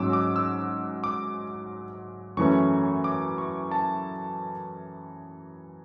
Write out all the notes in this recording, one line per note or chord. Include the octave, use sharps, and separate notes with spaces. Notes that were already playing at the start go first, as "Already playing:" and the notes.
Already playing: G#2 F#3 C#4 D6 E6
D6
E6
D6
F#2 E3 A3 C#4 C#6
D6
C#6
A5